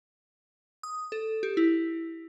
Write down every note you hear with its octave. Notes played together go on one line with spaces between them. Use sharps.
D#6
A4
G4
E4